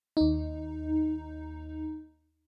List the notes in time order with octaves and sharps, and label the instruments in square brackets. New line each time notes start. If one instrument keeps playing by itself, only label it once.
[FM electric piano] D#2 D#4